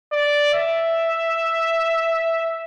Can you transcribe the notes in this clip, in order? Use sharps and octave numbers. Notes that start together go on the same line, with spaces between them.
D5
E5